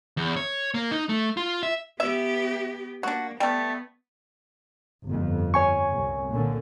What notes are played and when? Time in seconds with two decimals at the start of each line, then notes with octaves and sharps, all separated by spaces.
0.17 E2
0.36 C#5
0.74 A#3
0.91 D#4
1.09 A3
1.37 F4
1.63 E5
2.00 B3 G4 E5
3.03 A#3 D4 F#4
3.40 G3 A3 B3
5.06 G1 F2
5.54 C#5 G#5 C#6
5.92 C2
6.29 A#2 D3